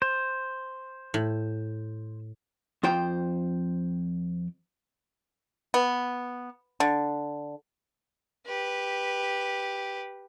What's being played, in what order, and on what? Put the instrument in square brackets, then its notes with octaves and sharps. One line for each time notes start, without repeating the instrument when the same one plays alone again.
[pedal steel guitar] C5
[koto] A2
[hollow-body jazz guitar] F2 F4 C5 G5
[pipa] B3
D3
[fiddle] G4 B4